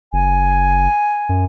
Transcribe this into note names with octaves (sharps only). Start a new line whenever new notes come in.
F#1 G#5
F#2